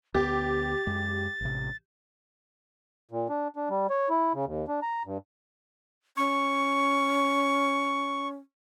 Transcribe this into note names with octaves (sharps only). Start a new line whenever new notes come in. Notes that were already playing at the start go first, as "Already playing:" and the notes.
D2 B3 G4 A6
F#2 G#3
A1 C3
A#2
D4
D4
G3
C#5
E4
C#3
D#2
D4
A#5
G2
C#4 C#6